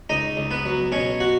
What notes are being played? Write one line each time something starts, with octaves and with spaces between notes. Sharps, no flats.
C#2 D#4 D#5
C#2
B3 B4
F#3
B2 C#4 C#5
F#4 F#5